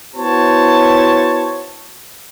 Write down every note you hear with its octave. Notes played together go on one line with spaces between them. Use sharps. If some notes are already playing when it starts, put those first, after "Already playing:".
B3 E4 F#4 C5 C#5 A5